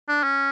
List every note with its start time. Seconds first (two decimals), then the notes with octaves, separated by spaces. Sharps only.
0.09 D4
0.23 C#4